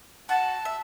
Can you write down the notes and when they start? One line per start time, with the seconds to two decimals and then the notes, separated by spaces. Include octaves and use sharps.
0.29 F#4 A5
0.65 E5